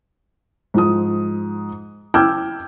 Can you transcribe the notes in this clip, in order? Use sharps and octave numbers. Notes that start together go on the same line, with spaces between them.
G#2 F3 D#6
G5 D6 E6 F6 G6 G#6